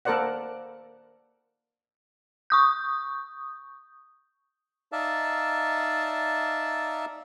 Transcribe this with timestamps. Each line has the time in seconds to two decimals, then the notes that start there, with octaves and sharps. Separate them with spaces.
0.05 A#3 A4 A#4 C5 D5 F#5
2.50 C#6 D#6 G6
4.92 D#4 D5 E5 F5 A5